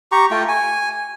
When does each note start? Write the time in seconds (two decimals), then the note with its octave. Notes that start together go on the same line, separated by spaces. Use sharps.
0.12 G4 A#5 C#6
0.31 A3 F4 G5
0.48 G#5